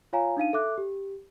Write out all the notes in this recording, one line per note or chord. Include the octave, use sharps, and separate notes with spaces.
F4 C#5 F5 G#5 A#5
D4 D#4 F5 D#7
A4 E5 D6 F#6
G4